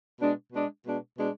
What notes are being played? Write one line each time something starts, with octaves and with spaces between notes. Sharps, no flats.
B2 G#3 D4
B2 G#3 D4
B2 G#3 D4
B2 G#3 D4